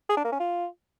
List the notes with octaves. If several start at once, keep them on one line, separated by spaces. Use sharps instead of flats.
G#4
D4
A#3
C#4
F4